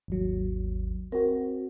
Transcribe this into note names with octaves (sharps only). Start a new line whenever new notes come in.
G#1 D#2 F#3
C4 F#4 A#4